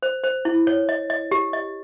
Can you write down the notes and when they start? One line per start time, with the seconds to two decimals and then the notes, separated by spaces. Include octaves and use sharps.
0.03 C5
0.24 C5
0.45 E4
0.67 C#5
0.89 D#5
1.10 D#5
1.31 G4
1.53 D#5